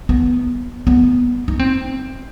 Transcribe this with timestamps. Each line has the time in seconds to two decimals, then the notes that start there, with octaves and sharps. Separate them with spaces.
0.09 B3
0.87 B3
1.48 D#4
1.59 C4